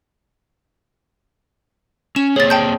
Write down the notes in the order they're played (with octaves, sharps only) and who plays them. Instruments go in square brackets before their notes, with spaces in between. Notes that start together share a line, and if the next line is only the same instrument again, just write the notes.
[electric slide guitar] C#4 [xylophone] E7
[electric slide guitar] A#3 C4 G#4 [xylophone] C#5 A6
[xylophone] G5 A5 G6